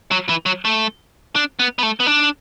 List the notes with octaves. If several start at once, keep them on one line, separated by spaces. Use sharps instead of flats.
F#3
E3
F#3
A3
D4
B3
B3
A3
B3
D4